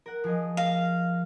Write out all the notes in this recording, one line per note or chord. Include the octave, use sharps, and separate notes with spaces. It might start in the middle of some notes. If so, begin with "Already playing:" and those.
A#4 F#5
F3 G#4 D#5
F5 A#6